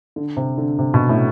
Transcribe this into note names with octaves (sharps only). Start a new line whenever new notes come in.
D3
C3
D3
C3
B2
A2